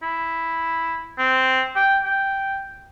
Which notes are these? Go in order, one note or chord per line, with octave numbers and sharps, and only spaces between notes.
E4
C4
G5
G5